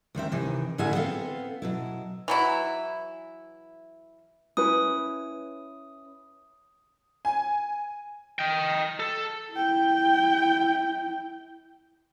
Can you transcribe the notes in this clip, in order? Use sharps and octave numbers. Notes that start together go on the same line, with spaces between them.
D2 D#3 C4 E5
C3 D#3 E3
A2 D3 E4 G#4 E5 F#5
B3 C4 A4 F5
B2 F#3 E4
E3 F#3 E4
C#4 E4 B4 D#6
G#5
D#5 G5
A4
E4 G5